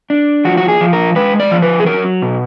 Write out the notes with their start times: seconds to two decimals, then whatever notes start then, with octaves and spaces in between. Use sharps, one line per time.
0.10 D4
0.45 F3 F#4
0.57 F#4
0.68 G#4
0.81 F3
0.93 A#4
1.16 G#3 B4
1.40 D5
1.51 F3
1.62 B4
1.80 G#4
1.86 F#3 A#4
2.22 B2